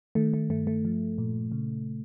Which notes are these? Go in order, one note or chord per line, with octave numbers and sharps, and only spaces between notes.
D#3 A3
A3
G2 A3
A3
F3
A#2
C#3